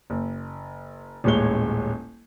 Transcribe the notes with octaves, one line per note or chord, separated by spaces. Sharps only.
F#1
D#1 A1 G#3 C#5 G7